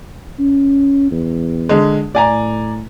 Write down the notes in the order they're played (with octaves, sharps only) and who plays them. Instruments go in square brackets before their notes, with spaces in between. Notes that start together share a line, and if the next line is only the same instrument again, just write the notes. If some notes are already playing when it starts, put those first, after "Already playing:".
[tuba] C#4
E2
[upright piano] D3 G#3
[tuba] A2 [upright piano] D5 G#5 A#5